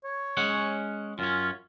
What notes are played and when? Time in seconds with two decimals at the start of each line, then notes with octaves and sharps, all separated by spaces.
0.04 C#5
0.37 G#3 C#4 F#5
1.19 F#2 C#4 F4